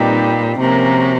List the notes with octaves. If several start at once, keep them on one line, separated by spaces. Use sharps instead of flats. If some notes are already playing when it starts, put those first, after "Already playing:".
Already playing: A#2 G3 C4 D#4 G4 B4
C3 F3 A#3 C#4 F#4 A#4